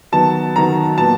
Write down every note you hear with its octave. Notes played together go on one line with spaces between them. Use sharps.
D#3 F#3 B3 A5
D#3 F#3 B3 A#5
A#2 F#3 B3 A5